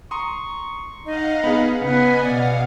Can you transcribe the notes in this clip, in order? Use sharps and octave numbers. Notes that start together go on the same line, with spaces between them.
A#5 C6 C#6 D#6
D#4 D#5 F5 F#5
B3 D#4 G#4 B5
C#3 B3 B4 D#5 F#5 G#5
B2 D5 F5 F#5